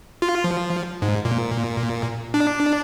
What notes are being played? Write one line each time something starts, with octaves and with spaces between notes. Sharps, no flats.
F4
F3
G#2
A#2
D4